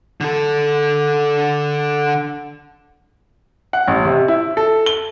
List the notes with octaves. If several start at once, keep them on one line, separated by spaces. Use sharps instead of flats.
D3 A4
F#5
A1
C3
E4
A4
G7